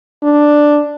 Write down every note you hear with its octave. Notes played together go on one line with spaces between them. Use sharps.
D4